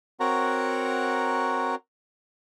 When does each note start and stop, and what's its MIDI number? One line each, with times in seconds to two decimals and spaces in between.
0.20 1.75 60
0.20 1.75 66
0.20 1.75 70
0.20 1.75 73
0.20 1.75 78
0.20 1.75 82